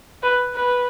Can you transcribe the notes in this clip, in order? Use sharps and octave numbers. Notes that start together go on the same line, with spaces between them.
B4
B4